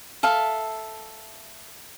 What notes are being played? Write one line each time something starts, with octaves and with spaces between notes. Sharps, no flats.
A4 E5 F5